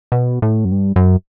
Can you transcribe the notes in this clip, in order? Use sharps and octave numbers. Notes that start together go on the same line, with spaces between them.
B2
A2
F#2
G2
F#2